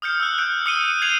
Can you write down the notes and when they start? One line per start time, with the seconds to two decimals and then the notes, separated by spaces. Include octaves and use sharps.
0.02 D#6 F6 G6 C#7
0.20 E6 F#6
0.38 F#6 G6 C#7 D7
0.66 D#6 C#7 D#7 G7
1.02 G#6 C7 C#7 D#7 F7 F#7